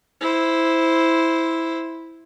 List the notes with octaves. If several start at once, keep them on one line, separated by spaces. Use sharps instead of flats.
E4 C5